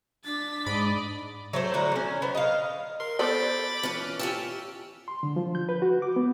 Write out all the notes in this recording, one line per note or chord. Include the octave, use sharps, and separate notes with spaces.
D4 A6 B6
G#2 D5 D#5 B5
F#3 A3 C5
A2 D3 F#4 A#5
F#3 C#4
B3 C5
D#5 F5
A#4 C6
B3 A4 C5 D5 B5 D6 A6
E3 C#4 F4
C#4 F4 G4 E6
C6
D3
F3
G6
B4
F#4
D6
B3